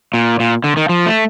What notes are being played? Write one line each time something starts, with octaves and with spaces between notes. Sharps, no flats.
A#2
A#2
D3
D#3
F3
A3